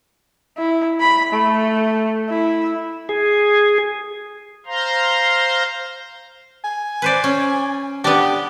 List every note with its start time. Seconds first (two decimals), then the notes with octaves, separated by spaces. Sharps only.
0.58 E4
1.00 B5
1.32 A3
2.29 E4
3.09 G#4
4.66 C5 F5 A#5 C6
6.64 G#5
7.02 B4 C5 D5
7.24 C#4
8.04 B3 D4 G4